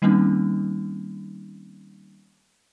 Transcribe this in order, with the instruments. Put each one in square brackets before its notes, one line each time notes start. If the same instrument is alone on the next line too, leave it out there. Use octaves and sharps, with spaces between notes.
[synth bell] D#3 G3 A#3 C4 C#4 D#4